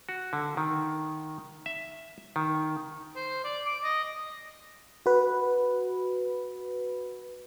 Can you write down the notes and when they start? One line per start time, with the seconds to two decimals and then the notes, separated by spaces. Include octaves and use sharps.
0.09 F#4
0.33 D3
0.57 D#3
1.66 E5
2.36 D#3
3.16 C5
3.44 D5
3.66 D6
3.84 D#5
5.06 F#4 B4